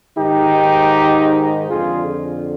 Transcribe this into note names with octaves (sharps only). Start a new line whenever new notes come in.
G#2 D#3 D#4 G4
F2 D3 F4 G#4